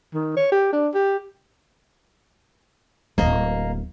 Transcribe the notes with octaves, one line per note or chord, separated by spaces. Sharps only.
D#3
C#5
G4
D4
G4
D1 G#1 A#3 D#5